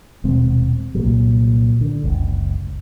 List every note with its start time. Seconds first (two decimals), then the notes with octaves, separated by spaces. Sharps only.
0.24 D#1 B2 G#3 C4
0.95 C2 A#2 F#3
1.81 D3
2.04 F#1 C#2